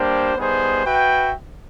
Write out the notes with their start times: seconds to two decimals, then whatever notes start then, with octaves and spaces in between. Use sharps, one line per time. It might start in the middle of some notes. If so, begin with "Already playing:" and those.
Already playing: G3 A#3 D4 G4 C5
0.37 G3 B3 D#4 G#4 C5
0.85 F#4 B4 E5 G5